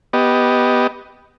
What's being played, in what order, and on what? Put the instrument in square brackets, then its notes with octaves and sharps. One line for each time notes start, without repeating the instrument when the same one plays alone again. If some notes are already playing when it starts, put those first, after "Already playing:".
[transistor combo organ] B3 G4 D#5